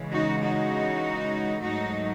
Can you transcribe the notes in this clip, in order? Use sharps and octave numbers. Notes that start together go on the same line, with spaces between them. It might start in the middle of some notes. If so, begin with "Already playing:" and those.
Already playing: C#3 E3 G#3
D#4 F#4
D#4 F#4
G#2 F#3 A3 D#4 F#4